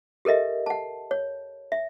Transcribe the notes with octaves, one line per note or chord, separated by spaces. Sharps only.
G4 A4 A#4 D#5 E5
F#5 A5
C#5
E5